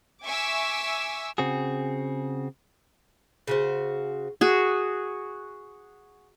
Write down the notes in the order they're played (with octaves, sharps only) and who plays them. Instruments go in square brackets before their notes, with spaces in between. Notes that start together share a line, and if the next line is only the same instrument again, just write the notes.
[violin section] E5 G#5 C#6 D6 E6
[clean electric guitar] C#3 C4 F#4 G#4
[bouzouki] C#3 F#4 C5
[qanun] F#4 G#4